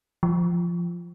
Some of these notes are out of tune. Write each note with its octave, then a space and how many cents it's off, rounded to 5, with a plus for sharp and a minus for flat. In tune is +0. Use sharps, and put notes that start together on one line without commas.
F3 -10